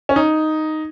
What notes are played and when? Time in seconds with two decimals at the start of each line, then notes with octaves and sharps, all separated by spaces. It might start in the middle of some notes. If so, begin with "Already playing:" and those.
0.09 C#4
0.16 D#4